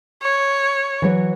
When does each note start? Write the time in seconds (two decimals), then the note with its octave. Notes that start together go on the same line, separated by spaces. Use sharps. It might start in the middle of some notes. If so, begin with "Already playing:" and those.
0.22 C#5
1.02 E3 F#3 C#5